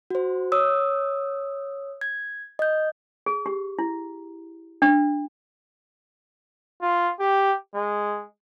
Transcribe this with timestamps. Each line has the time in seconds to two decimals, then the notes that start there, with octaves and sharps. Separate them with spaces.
0.11 F#4 C5
0.52 C#5 D#6 E6
2.01 G#6
2.59 D#5 G6
3.26 G#4
3.46 G4
3.79 E4
4.82 D4
6.82 F4
7.20 G4
7.75 G#3